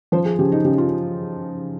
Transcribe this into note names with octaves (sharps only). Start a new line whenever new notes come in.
F3 C5
G#4
C#3 G4
D#4
C#3 G4
F4